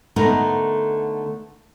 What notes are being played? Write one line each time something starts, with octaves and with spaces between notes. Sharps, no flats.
D3 A3 B3 D#4 A#4